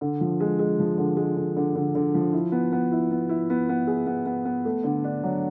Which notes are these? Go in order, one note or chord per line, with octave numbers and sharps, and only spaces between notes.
D3
F3
G#3
G#3
F3
D3
G#3
D3
D3
D3
D3
F3
E4
B3
B3
E4
B3
E4
B3
B3
G#4
B3
B3
B3
A3
D3
D4
F#3